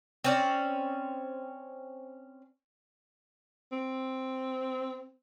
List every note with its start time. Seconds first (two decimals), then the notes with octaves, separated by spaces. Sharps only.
0.24 C4 C#4 D5
3.72 C4